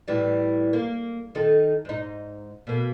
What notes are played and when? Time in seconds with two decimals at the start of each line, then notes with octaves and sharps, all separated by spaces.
0.08 A2 E3 G3
0.73 A#3
1.35 D#3 D#4 A4
1.85 G#2 D#4
2.67 B2 A#3